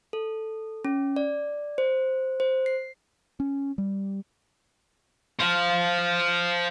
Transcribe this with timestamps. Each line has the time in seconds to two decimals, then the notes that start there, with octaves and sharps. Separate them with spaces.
0.13 A4
0.85 C#4
1.16 D5
1.78 C5
2.40 C5
2.66 C7
3.40 C#4
3.78 G3
5.39 C5 F5